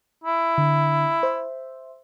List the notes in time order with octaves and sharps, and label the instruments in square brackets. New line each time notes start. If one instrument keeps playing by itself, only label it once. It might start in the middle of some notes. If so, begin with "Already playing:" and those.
[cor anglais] E4
[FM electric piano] D3
C5 E5